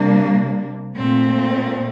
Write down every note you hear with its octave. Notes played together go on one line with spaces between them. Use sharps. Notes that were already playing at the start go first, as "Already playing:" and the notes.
Already playing: C3 G3 A#3 D4
A#2 A3 C4